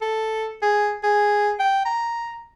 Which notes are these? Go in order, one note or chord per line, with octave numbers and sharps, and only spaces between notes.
A4
G#4
G#4
G5
A#5